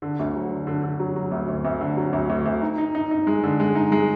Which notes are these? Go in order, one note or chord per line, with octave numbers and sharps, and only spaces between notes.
D3
D2
F#3
D3
D3
D3
F#3
F#3
D2
D2
D2
D3
F#3
D2
D2
D2
D#4
D#4
D#4
D#4
G#3
D3
G#3
D#4
G#3